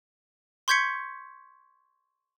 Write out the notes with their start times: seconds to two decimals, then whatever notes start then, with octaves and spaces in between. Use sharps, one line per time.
0.68 C6 C#6 G6 G#6 B6 C#7